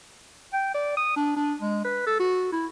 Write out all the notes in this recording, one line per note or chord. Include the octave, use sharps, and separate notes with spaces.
G5
D5
D#6
D4
D4
G#3
B4
A4
F#4
E4